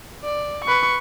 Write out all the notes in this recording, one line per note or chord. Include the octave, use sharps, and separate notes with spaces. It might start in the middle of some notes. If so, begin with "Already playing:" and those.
D5
B4 C#6